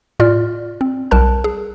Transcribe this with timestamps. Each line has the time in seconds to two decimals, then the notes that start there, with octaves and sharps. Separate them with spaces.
0.20 A2 F4 D5 F6
0.81 C4
1.11 B1 G3 A#4 A5 F#6
1.44 G#4